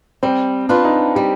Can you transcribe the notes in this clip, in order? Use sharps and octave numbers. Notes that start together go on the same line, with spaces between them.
G3 C4
D4 F4 B4
D#4
G3 G4